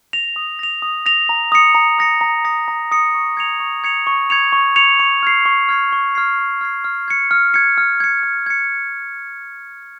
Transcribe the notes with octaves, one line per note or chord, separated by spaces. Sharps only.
A#6 F7
D#6
A#6 F7
D#6
A#6 F7
A#5
D#6 A#6 C#7
A#5
D#6 A#6 C#7
A#5
D#6 A#6 C#7
A#5
D#6 A#6 C#7
C#6
G#6 C#7 F7
C#6
G#6 C#7 F7
C#6
G#6 C#7 F7
C#6
G#6 C#7 F7
C#6
F6 G#6 C7
C#6
F6 G#6 C7
C#6
F6 G#6 C7
C#6
F6 G#6 C7
F6
G#6 C#7
F6
G#6 C#7
F6
G#6 C#7
F6
G#6 C#7